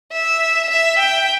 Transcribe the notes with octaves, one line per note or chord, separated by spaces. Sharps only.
E5
E5
G5